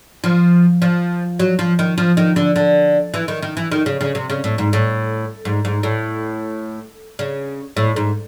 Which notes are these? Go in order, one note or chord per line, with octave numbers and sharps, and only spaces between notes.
F3
F3
F#3
F3
D#3
F3
D#3
D3
D3
E3
D#3
D#3
E3
D#3
C#3
C#3
C3
C#3
A2
G#2
A2
G#2
G#2
A2
C#3
A2
G#2